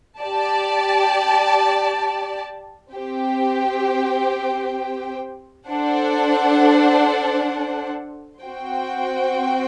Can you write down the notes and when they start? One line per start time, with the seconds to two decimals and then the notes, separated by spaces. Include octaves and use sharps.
0.20 G4 D5 A5
2.94 C4 G4 C5 G5
5.68 D4 A4 C5 F#5
8.43 C4 F#4 C5 G5